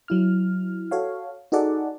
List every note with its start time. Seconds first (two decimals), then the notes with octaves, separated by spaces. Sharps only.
0.08 F#3 E4 F6
0.91 F#4 A4 C#5 F5
1.52 D#4 F#4 G#4 A4 D5 F#5